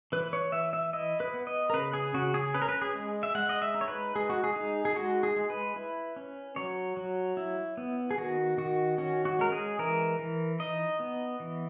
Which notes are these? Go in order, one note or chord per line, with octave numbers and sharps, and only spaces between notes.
E3 B4
C#5
E3 E5
E5
E4 D#5
B4
B3
D#5
A#4
C#3 B4
G#4
C#3 F#4
G#4
C#4 B4
A#4
B4
G#4
G#3
E5
G#3 F#5
D#5
E5
D#4
C#5
B4
G#3 G#4
F#4
G#4
D#4
G#4
G#3 F#4
G#4
G#3
B4
E4
C#4
F#3 C#5
F#3
E4
B3
G#4
D#3 F#4
D#3 F#4
C#4 F#4
F#4
G#3 A#4
G#4
E3 A#4
E3
D#4 D#5
B3
E3